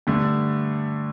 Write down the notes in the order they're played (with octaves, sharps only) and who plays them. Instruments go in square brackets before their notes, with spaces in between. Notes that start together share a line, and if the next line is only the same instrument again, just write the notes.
[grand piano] G2 D3 A3